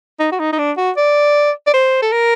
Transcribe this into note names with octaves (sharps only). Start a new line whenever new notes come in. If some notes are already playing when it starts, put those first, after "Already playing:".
D#4
F#4
D#4
D#4
D4
F#4
D5
D5
C5
A4
A#4